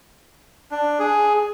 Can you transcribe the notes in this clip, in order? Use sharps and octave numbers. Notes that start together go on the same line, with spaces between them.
D4
G#4